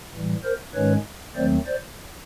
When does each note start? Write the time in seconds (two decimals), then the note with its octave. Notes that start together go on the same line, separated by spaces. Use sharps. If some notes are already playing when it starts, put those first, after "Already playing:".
0.13 A2 E3 G3
0.44 A#4 C5
0.74 G#2 D#3 G#3 C#4 B4 C#5
1.36 D#2 D#3 F#3 A3 C4 C5 D5
1.67 C5 D5